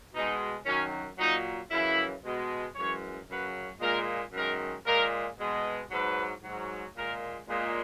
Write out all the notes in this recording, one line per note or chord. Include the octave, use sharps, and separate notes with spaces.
B2 G#3 D#4
F#2 D#3 F#3 C#4
A#2 F#3 D#4
F#2 C#3 E3 E4
B2 G#3
F#2 E3 G#3 C#5
F#2 C#3 F#3 B4
A#2 G#3 A#4
F#2 D#3 G#3 A#4
A#2 G#3 A#4
B2 G#3
G#2 F#3 B4
G#2 F#3
A#2 G#3 A#4
A#2 G#3